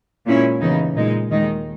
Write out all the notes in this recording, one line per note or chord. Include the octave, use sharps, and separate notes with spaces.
A#2 G#3 C#4 E4
D#2 C#3 E3 B3 D#4
A#2 G#3 D#4
D#2 D#3 G#3 D#4